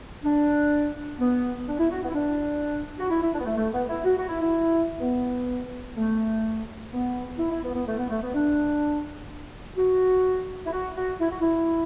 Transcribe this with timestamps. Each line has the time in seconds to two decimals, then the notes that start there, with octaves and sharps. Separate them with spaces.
0.24 D4
1.20 B3
1.67 D4
1.79 E4
1.90 F#4
2.03 B3
2.09 E4
2.14 D4
2.99 F#4
3.09 E4
3.22 E4
3.33 D4
3.40 B3
3.45 A3
3.57 A3
3.73 B3
3.89 E4
4.05 F#4
4.18 F#4
4.29 E4
4.41 E4
5.00 B3
5.96 A3
6.92 B3
7.38 E4
7.51 E4
7.63 B3
7.74 B3
7.87 A3
7.98 B3
8.10 A3
8.22 B3
8.34 D4
9.77 F#4
10.66 E4
10.72 F#4
10.96 F#4
11.20 E4
11.30 F#4
11.40 E4